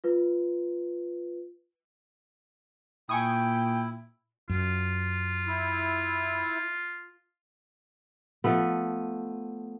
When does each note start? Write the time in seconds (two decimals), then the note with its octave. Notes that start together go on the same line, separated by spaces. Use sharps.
0.04 F4 B4
3.09 A#2 E4 G5 G#5 C#6 D#6
4.50 F#2 F4
5.47 E4
8.44 F3 A3 B3